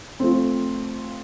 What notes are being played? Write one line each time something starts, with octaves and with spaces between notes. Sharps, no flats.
F3 A3 C4